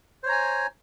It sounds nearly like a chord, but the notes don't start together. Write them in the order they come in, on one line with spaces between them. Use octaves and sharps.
C5 C#5 A#5 G#5